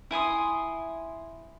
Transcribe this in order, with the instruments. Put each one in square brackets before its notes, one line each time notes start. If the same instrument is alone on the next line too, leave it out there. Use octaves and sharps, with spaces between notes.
[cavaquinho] E4 G#5 C6 D#6